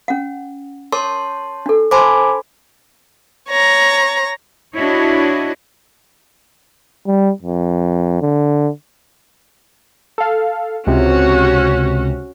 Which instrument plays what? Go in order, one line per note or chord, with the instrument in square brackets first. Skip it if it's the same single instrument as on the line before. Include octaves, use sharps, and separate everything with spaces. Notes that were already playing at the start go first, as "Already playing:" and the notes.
[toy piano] C#4 F#5
[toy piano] A#4 D6 [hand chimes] C#5 A5 C6
[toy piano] D4 A4
[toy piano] C5 A5 C6 [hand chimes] G#5 B5 D6
[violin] C#5 A#5
[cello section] D4 E4 F#4 C#5 D#5
[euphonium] G3
F2
D3
[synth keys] A4 F5
[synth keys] C#2 C3 [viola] C#4 F#4